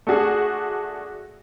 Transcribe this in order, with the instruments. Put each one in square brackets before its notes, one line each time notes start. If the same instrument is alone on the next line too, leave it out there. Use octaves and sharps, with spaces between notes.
[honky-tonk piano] A3 D4 F#4 G#4